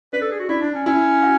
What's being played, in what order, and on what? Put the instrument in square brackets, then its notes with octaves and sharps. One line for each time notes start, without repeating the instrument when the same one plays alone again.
[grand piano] D4 [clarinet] B4
[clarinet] A4
G#4
F#4
[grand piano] D4 [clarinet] E4
[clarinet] D4
C#4
[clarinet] C#4 [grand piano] E4
[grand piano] F#4